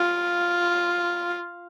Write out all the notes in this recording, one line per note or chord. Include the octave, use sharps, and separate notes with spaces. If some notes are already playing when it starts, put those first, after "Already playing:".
Already playing: F4